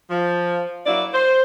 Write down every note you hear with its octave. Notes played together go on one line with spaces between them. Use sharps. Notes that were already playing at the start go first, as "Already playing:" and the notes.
F3
F#3 A#3 E4 D5
C5